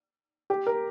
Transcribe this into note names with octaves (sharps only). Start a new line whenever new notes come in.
G4
A#4